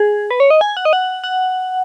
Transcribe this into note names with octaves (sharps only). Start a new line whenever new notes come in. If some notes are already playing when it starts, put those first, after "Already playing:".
Already playing: G#4
B4
C#5
D#5
G#5
F#5
D#5
F#5
F#5